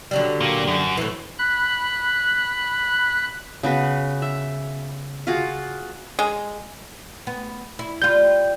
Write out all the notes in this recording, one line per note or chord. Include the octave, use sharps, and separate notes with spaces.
D3 F#3 G3
A#2 A#3
F#2
A2 E3
B5 F#6
C#3 B3 F#4 B4
E5
F4 F#4 G#4
G#3
B3
E4
G3 F4 G6